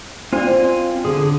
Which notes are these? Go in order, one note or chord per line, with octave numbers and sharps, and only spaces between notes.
C4 F4 C5 D5 G#5
D3 G#4